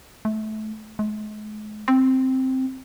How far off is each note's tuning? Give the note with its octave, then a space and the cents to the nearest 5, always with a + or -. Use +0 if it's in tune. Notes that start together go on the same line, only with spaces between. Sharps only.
A3 -25
G#3 +40
C4 +0